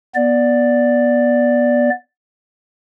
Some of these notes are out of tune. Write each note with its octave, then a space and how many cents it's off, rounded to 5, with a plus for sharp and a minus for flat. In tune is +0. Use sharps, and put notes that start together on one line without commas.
B3 -20 D5 +0